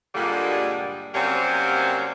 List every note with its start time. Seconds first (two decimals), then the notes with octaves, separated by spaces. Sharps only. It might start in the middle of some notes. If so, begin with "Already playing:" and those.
0.15 G2 A#2 D3 G3 G#3 A#3
1.14 C3 F#3 G3 A#3 C4 C#4